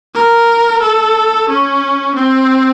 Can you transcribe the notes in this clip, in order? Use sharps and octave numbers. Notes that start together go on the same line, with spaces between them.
A#4
A4
C#4
C4